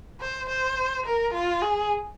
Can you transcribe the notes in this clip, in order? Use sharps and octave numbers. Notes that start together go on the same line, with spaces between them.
C5
C5
A#4
F4
G#4